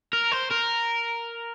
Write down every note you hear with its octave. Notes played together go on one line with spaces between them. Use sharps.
A#4
C5
A#4